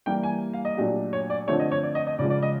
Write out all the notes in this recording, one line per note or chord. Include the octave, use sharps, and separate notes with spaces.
E3 G3 A#3 G5
G#5
F5
D#5
A#2 F#3 A3 D4 G4
C#5
D5
D3 F3 A3 C4 C#5
D#5
C#5
D5
D#5
D#5
C#3 F3 G#3 D5
D5
D#5